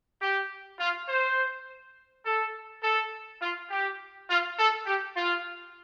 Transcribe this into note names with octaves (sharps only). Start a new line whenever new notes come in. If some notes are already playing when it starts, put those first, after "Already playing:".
G4
F4
C5
A4
A4
F4
G4
F4
A4
G4
F4